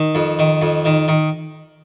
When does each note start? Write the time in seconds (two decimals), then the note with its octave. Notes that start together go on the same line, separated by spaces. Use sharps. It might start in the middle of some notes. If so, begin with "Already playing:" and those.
Already playing: D#3
0.15 F2
0.39 D#3
0.62 F2
0.85 D#3
1.08 D#3